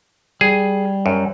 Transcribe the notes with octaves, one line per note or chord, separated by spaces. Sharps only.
G3 G#4
F#2